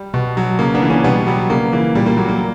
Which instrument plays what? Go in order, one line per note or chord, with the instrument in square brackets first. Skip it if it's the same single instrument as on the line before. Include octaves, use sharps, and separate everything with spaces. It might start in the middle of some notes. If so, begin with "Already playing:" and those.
Already playing: [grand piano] G3
B2
F#3
C#3 A#3
B3 D4
E3
A#3 C#4
B2 G3 B3
F#3 G3
C#3 A#3
E3 A#3
A#2 G3
A#3
F#3 A#3
A#3